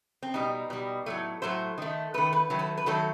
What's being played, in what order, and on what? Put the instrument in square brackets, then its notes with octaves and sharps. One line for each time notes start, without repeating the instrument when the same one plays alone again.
[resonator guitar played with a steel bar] C4
B2 G3 D#4
B2 G3
A2 F#3 A3
A2 F#3 A3 C5
D#3 A3
D#3 A3 B4
B4
D#3 F#3 A3
B4
B4
D#3 F#3 A3 A4